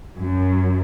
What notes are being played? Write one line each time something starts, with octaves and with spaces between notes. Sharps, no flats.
F#2